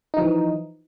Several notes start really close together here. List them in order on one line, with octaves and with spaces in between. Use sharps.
D#4 F3 E3